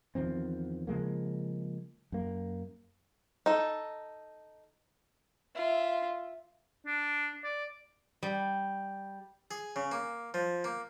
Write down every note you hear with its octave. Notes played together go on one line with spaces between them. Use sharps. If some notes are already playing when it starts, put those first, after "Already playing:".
E2 D#3 F3 C4
C#3 F3 G#3 A#3
F#2 A#3
D#4 A4
F4 E5
D4
D5
G3
G#4
C#3
A#3
F3
A#3